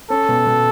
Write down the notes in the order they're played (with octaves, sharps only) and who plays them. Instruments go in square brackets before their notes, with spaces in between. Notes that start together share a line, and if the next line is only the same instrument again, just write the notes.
[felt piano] C#4 [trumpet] A4
[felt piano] B2
B2